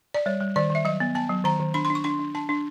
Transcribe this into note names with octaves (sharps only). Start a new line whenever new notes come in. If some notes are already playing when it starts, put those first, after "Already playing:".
D5
G3 C#5
G3
D#3 D5
D#3
E5
F#3 D#5
B3
B3 A5
F#3
D#3 A#5
D#3
D4 B5
C6
D4
C#6
D4 C6
D4
D4 A5
D4